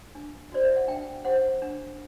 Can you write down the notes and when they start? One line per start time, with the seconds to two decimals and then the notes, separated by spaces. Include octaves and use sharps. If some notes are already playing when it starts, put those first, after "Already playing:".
0.15 D4
0.52 F#4 C5 D5
0.65 E5
0.76 F#5
0.88 D4 G5
1.25 G4 C5 F#5
1.62 D4